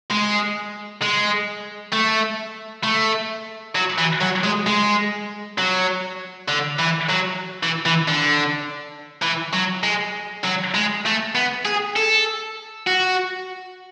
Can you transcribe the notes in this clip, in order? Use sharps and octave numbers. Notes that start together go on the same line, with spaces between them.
G#3
G#3
A3
A3
F#3
E3
F#3
G#3
G#3
F#3
D3
E3
F#3
E3
E3
D3
E3
F#3
G#3
F#3
G#3
A3
B3
G#4
A4
F#4